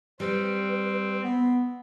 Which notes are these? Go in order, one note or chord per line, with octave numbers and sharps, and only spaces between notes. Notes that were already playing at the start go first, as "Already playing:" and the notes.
G3 C4 B4
B3